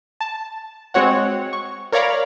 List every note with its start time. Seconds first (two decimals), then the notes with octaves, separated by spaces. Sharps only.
0.21 A5
0.94 G#3 C4 F#4 C#5 F#5
1.53 C#6
1.92 A#4 C#5 D5 F5 A#5 B5